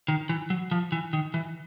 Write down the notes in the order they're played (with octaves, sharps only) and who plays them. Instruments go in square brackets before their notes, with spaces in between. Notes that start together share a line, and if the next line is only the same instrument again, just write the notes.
[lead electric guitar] D#3
E3
F#3
F3
E3
D#3
E3